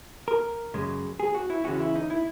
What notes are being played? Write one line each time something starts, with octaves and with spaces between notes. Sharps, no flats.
A#4
F#2 C#3 G#3
G#4
F#4
E4
C#3 E3 G#3 C#4 F#4
E4
D#4
E4